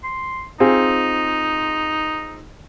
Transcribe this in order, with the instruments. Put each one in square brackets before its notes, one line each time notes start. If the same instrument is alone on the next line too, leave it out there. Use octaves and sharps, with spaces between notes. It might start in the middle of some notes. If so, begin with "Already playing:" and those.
[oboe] C6
[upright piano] C4 F4 G#4 [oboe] D#4